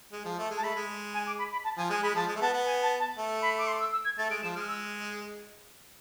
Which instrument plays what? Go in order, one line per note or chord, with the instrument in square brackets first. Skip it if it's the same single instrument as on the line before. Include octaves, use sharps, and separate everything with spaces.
[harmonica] G#3
F3
A3
G#3
[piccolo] A5
[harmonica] A3 [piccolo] B5
[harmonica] G#3
[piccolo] G#5
D6
B5
B5
A5
[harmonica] F3 [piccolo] G#5
[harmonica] G#3 [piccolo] G#5
[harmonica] G#3 [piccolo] B5
[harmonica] F3 [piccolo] A5
[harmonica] G#3
A3
[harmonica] B3 [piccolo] A5
[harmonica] B3
[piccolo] G#5
A5
A5
[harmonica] A3
[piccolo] B5
D6
C6
E6
E6
G#6
[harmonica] A3 [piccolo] A6
[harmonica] G#3 [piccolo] D7
[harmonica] F3 [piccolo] E7
[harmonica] G#3 [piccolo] F6
[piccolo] E6